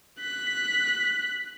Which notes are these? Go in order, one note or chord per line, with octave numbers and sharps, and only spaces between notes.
F#6 B6